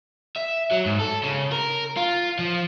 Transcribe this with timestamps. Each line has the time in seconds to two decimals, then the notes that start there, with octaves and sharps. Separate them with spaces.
0.36 E5
0.71 F#3
0.86 G#2
1.00 A4
1.23 C#3
1.52 A#4
1.97 F4
2.39 F3